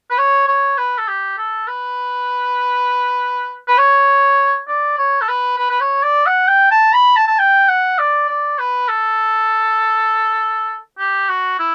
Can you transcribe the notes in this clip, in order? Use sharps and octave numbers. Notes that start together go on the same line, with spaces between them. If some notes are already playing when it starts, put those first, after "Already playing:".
B4
C#5
C#5
B4
A4
G4
A4
B4
B4
C#5
D5
C#5
A4
B4
B4
B4
C#5
D5
F#5
G5
A5
B5
A5
A5
G5
F#5
D5
D5
B4
A4
G4
F#4
E4